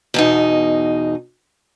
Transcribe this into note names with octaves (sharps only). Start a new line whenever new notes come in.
E2 B2 D#4